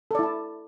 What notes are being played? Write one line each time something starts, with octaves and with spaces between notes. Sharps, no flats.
E4 A4 D5 A5